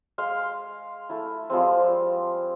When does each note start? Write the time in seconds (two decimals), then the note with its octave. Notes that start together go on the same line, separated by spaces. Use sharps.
0.18 G#3 F5 C6
1.09 A3 E4
1.50 F3 G3 G#3 C4